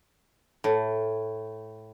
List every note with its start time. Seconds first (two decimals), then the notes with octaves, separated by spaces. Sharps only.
0.64 A2